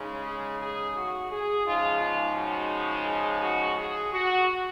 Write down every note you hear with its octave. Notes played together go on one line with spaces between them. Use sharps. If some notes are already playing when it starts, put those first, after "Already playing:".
Already playing: C#3 G#3 D#4
G#4
G#4
F#4
G#4
C#3 F3 G#3 D#4 F4
F4
F#4
G#4
F#4
G#4
F#4